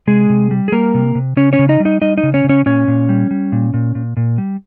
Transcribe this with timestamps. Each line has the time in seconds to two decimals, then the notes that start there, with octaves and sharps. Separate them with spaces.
0.07 C3 G#3 G#4
0.30 C3
0.51 G3
0.68 G#4
0.72 G3 A#3 A#4
0.94 C3
1.15 C3
1.37 C#3 C#4 C#5
1.53 C#4 C#5
1.59 C#3
1.69 D#4 D#5
1.80 G3
1.85 D#4 D#5
2.01 G3 D#4 D#5
2.18 D#4 D#5
2.23 C#3
2.34 C#4 C#5
2.44 C#3
2.49 C#4 C#5
2.66 A#2 C#4 C#5
2.88 A#2
3.09 G3
3.31 G3
3.52 A#2
3.74 A#2
3.95 A#2
4.17 A#2
4.38 G3